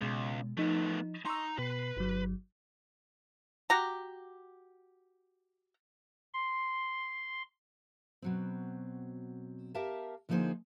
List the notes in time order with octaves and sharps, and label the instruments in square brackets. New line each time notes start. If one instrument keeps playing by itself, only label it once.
[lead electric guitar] C#2 [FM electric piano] B2 G#3
[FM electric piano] F3 D#4 [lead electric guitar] A3 B3
[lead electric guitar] D#4 A#5 [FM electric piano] C6 C#6 E6
[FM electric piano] B2 C7 [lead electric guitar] B4
[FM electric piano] G1 F#3
[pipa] F#4 G4 A#5
[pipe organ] C6
[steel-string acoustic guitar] B2 F#3 C4
G4 A#4 E5 F5 A5
D3 F3 A#3 D#4 G#4 C5